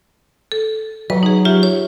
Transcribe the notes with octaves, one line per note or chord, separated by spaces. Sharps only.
A4
F#3 B4
D#4 G#4
F4 G4 E5
C#5